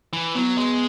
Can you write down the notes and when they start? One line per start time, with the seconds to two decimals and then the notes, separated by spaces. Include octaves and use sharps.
0.13 E3
0.35 F#3 B3
0.58 G#3